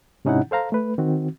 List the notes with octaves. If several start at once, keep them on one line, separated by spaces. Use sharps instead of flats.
G#2 C3 C#4 D#4 E4 F#5
A4 C5 F5 A#5
A3 B4
D#3 C4 F#4